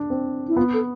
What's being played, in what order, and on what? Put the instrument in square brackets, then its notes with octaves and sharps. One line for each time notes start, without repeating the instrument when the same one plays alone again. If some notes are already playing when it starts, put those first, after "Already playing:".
Already playing: [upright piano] D4
C4
[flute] E4
[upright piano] B3 [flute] F4
[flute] A4